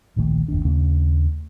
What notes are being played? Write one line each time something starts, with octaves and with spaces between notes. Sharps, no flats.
D1 A#1 D#3 A3
F#1 D#2 D4
D#2 C#3 A3 C#4